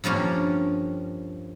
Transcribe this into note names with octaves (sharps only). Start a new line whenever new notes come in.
G2 F3 A#3 C#4